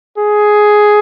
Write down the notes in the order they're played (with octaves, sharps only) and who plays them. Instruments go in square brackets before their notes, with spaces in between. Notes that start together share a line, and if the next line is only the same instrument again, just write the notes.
[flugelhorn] G#4